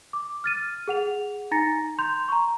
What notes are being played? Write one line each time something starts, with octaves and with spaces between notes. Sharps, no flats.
D6
F6 A6 D#7
G#4 F#5 F7
D#4 G#5 A#5 A6 A#6 C#7
A#5 C6 G6 F7
A#5 C#6